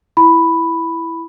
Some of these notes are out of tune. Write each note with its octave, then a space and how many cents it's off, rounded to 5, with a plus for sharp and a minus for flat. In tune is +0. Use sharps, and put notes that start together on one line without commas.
E4 +5 B5 +0